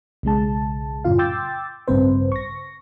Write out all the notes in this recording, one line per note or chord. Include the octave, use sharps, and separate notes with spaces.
B1 C#3 G#3 A5
F#2 A2 C#3 F4 F5
G5 C6 D6 E6 G6 A6
A1 G2 C#3 C4 B4 C5
C#6 A#6